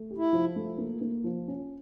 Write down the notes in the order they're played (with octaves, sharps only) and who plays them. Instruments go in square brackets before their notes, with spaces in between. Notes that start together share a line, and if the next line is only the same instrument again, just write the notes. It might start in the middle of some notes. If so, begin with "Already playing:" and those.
Already playing: [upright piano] A3
G4
[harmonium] E4
[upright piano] F3
A3
A#3
A#3
F3
C#4